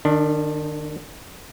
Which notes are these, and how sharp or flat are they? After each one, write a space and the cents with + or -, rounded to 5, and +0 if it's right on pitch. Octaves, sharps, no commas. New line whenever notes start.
D#3 -35 D4 +0